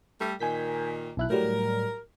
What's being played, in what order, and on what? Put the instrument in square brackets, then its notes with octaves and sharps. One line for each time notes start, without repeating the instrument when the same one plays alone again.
[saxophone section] G3 A3
[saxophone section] A#2 D#3 [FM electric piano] G#5 G6 B6
[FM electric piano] B1 E4 F#6
[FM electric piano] A2 F#3 G3 [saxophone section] A#4